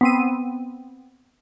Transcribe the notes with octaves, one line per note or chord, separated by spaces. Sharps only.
B3 C4 D#7